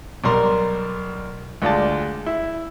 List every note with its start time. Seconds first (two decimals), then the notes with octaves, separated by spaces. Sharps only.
0.24 B1 G3 A#4 C6
1.62 D2 G#3 F4 D5 A5
2.26 E4